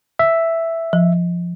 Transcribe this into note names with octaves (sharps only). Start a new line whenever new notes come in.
E5
F3